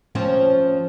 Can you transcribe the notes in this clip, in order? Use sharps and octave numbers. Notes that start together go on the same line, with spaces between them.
F3 C4 C#4